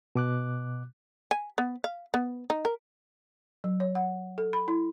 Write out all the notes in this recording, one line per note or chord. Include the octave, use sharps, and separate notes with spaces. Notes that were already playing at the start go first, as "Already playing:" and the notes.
B2 D6 F#6
G#5
B3
F5
B3
D#4
A#4
F#3
C#5
F#5
A4
B5
E4